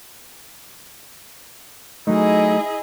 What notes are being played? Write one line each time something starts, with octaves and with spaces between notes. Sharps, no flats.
F#3 A3 D#4 E4 G#4 D#5